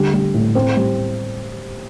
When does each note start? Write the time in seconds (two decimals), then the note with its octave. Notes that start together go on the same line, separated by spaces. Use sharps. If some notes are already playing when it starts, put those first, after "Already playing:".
Already playing: D3 G3
0.13 G3
0.34 A2
0.55 C4
0.77 G3